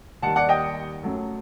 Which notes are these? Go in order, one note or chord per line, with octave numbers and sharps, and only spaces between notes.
D#2 D#3 G3 F#5 A5
D5 F#5
D#5 G5
F#2 F#3 A3